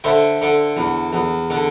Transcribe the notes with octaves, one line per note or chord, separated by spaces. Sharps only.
D3 C5 E5
D3
E2
E2
D3